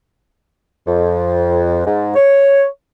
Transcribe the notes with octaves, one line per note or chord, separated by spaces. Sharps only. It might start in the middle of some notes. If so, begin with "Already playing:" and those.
F2
G#2
C#5